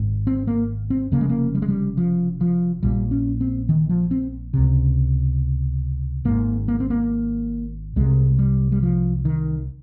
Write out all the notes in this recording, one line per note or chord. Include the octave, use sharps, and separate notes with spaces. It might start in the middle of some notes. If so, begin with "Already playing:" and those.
Already playing: G#1 G#2
C4
A#3
C4
F1 F2 C#3 A#3
G#3
A#3
G3
G#3
G3
F3
F3
A#1 A#2 G3
C#4
C4
D#3
F3
C4
C#2 C3
G#1 G#2 A#3
A#3
C4
A#3
C2 C3 G#3
G3
G3
F3
D#3